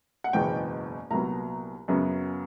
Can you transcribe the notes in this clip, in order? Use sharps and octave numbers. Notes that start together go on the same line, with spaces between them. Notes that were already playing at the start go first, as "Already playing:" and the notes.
F#5
F#1 E2 B2 G#3 B3 G5
C2 A#2 F#3 B3 A#5
F#2 C#3 F#3 B3